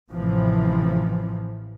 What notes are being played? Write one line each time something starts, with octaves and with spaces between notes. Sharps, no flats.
A1 A2 C3 E3 F3